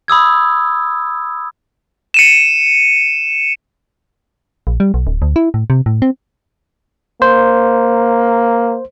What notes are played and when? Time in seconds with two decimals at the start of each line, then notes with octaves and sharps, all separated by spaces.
0.08 B5 D#6 E6 G#6
2.14 C#7 D#7 E7
4.67 A#1
4.80 G3
4.94 B1
5.07 D1
5.22 D2
5.36 E4
5.54 A2
5.70 C3
5.86 A2
6.02 C4
7.22 A#3 C5